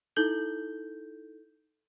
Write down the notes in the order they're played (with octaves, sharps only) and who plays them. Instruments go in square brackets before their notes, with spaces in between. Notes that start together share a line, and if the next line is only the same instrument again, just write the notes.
[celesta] D#4 E4 A4 G6 F#7 G7